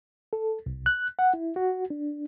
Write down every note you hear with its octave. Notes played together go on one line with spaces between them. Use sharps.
A4
C2
F#6
F#5
E4
F#4
D4